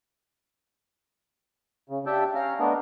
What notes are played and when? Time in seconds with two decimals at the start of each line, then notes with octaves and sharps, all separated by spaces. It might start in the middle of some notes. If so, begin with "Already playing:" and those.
1.89 C#3
2.06 D4 G4 E5 G5 A5
2.35 C#4 F5 A#5 F6
2.60 A3 B3 D4 A#4 D#5